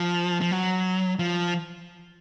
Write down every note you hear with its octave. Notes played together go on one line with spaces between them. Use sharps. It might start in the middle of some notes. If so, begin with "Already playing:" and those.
Already playing: F3
F3
F#3
F3